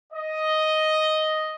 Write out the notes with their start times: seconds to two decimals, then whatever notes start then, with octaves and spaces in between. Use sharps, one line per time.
0.12 D#5